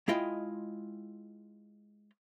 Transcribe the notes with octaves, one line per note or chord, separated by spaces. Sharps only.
G#3 E4 F4 D#5 G5